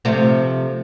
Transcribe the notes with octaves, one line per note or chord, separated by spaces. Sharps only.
C3 F3 A3